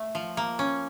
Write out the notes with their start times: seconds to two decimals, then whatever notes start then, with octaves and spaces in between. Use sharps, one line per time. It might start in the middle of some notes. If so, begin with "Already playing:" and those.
Already playing: A3
0.15 F3
0.37 A#3
0.59 C#4